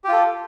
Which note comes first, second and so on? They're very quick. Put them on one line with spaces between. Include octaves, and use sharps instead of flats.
G4 F4 A4